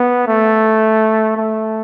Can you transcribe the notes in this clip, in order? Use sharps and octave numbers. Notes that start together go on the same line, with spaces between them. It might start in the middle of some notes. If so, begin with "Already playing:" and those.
Already playing: B3
A3
A3